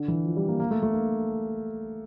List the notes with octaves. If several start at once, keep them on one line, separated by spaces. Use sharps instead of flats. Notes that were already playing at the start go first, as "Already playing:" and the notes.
Already playing: D3
E3
F3
G3
A#3
A#3
A3
A3
A#3